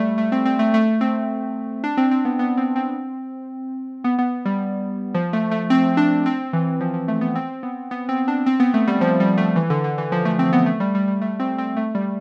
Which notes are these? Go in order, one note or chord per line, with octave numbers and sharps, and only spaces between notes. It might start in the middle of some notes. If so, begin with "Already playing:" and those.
Already playing: G3 A3
A3
C4
C4
A3
A3
C4
D4
C4
C4
B3
B3
C4
C4
B3
B3
G3
F3
A3
A3
C4
D4
C4
E3
F3
F3
A3
B3
C4
B3
B3
C4
D4
C4
B3
A3
G3
F3
G3
A3
E3
D3
D3
E3
F3
A3
C4
B3
A3
G3
G3
G3
A3
C4
C4
A3
G3